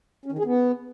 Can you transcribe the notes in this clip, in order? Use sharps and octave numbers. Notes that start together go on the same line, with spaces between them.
C#4
D#3
G#4
B3